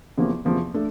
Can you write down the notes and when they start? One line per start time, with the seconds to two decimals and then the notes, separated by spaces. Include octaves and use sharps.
0.17 E2 C3 F3 A#3
0.45 E2 C3 F3 A#3
0.74 A3 D4 A4